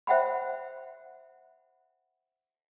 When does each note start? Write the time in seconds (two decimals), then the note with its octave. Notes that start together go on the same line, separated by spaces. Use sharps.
0.07 C5 E5 F#5 G5 B5